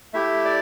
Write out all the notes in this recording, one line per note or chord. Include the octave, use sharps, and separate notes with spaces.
A3 E4 G4 E5
D5